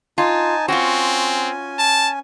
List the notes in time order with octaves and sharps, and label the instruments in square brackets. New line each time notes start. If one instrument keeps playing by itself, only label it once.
[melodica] D#4 G#5 A5 [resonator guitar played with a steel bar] F4
[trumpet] C4 [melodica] C#4 G#5 [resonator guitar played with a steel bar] F4 F#4
[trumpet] A5